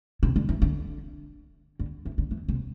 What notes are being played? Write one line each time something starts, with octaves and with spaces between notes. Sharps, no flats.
C3
D3
E3
D3
D3
E3
D3
E3
C3